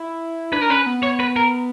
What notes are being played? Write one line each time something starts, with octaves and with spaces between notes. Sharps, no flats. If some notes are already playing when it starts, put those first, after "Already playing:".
Already playing: E4
D4 B4
A#4
C#4 B4
B3
C#5
B4
A#4